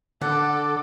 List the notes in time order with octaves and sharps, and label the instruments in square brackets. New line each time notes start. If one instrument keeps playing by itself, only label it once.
[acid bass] D3 [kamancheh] A4 [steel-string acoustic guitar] F#5 [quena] D6